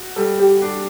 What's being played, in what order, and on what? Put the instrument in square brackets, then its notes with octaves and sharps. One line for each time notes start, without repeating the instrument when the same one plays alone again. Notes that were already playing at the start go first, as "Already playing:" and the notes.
Already playing: [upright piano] F#4
[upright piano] G3 [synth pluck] A4
[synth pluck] G4
[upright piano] D4